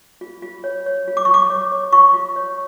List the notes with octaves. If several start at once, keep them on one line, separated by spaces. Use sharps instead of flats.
F4
F4
C#5
C#5
F4
D6
F4 C#6
D6
C#5
C#5
F4 C#6
F4
C#5